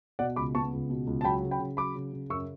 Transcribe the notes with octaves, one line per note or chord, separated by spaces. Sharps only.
B2 D5 F#5
C#2 B5 D6
B3 A5 C#6
C#2
B2
C#2
A5
F#3 G5 B5
C#3
G5 B5
C#3
F#3 B5 D6
C#3
C#3
F#2 C#6 E6